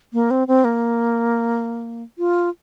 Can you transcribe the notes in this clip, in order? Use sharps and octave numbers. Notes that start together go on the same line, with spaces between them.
A#3
C4
C4
A#3
F4